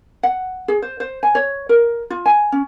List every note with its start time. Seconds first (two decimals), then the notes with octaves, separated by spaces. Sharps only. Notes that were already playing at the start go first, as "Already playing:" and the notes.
0.23 F#5
0.68 G#4
0.82 C5
1.00 C5
1.23 G#5
1.35 C#5
1.69 A#4
2.10 F4
2.26 G#5
2.52 C#4